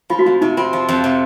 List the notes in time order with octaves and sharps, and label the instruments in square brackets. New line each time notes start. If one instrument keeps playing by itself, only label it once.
[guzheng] F3 [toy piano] F4
[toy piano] F#4
[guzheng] F2 [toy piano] F4
[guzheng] C3 [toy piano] D#4
[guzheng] C4 [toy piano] F4
[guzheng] F3
F2
C3